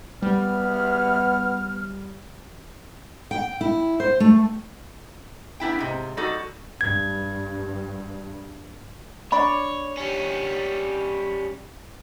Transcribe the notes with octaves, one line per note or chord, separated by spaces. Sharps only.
G3 B3 F6
G5
E4
C5
A3
B3 D4 E4 G5
G#2 C3
G3 D#4 F#4 A4
G2 G#6
D4 C#5 D5 B5
G3 C#4